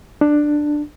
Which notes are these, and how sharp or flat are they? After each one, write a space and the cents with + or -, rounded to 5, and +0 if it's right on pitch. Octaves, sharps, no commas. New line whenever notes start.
D4 +10